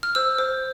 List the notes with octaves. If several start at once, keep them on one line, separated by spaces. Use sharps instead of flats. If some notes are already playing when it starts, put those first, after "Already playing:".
F6
C5 E6
C5